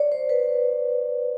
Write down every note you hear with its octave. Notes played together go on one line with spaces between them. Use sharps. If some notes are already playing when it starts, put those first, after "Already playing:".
Already playing: C#5 D5
C5
B4